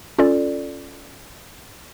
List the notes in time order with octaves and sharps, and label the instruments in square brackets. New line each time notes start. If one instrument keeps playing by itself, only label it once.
[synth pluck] C#4 F4 A4 D5